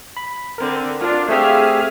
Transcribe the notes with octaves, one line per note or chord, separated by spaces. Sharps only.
B5
D3 C4 A#4
D4 F4
A3 C4 G4 G#4 E5 F5